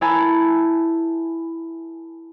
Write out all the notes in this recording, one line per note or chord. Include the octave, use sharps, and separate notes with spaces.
E4 A#4 E5 G#5 A5 B5